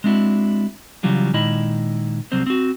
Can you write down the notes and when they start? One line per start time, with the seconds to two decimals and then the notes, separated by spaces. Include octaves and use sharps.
0.04 G#3 C4 D4 E4 F#4
1.03 C#3 E3 F#3 G3 F4
1.34 A#2 D#3 G#3 E4 D#5 B5
2.32 C2 F#3 G3 C4 C5
2.47 C4 F#4